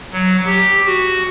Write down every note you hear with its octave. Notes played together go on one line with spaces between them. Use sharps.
F#3
G4
F#4